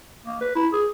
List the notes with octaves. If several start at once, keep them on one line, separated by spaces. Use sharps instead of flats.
A#3
B4
E4
G#4